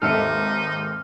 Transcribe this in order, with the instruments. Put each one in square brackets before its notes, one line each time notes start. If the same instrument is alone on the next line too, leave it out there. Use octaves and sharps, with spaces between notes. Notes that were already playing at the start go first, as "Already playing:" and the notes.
[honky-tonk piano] G#1 D#2 G#2 [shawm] D#4 [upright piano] A4 E5 C#7 [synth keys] F6